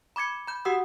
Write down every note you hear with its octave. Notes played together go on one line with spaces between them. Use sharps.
B5 D6 G#6 C#7
B5 G6
F#4 G4 F#5 D#6 E6